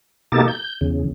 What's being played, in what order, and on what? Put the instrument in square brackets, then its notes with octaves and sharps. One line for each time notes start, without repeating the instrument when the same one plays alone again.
[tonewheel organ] B2 A#3 D#4 G4 A4 A6
G6
E2 C#3